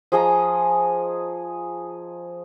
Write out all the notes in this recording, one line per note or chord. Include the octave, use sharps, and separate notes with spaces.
F3 G#4 D#5 A#5